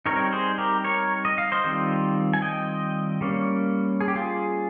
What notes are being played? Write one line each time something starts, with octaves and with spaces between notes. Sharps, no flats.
G3 C4 D#4 A#4 C#5
G#4 C5
G4 A#4
A#4 C#5
D#5
F5
C5 D#5
D#3 G3 C4 F4
G#5
D#5 G5
G3 A#3 C#4
G#4
G4
F4 G#4